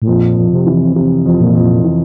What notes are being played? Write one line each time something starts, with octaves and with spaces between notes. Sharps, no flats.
A2
F2 A#2
F2
C3
E3
C3
F2
A#2
F2
E3